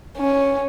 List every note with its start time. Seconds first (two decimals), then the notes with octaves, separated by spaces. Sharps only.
0.18 C#4